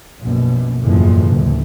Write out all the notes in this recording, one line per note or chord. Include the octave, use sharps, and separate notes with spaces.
A#1 F#2 B2
F#1 E2 A2 C#3 E3 F3
F#1 D2